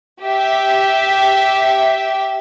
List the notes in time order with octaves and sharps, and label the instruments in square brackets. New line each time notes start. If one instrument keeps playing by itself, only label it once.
[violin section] G4 E5